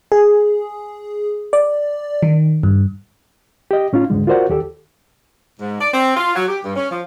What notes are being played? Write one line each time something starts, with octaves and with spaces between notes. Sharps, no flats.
G#4
D5
D#3
G2
G4 D#5
A2 C#4 D#4 F4
D2 G#2 D3 G#3
F4 F#4 A#4 C5 D5 F#5
D#2 G4 A4
G#2
D5
C4
F4
F#3
G4
G2
C#4
F3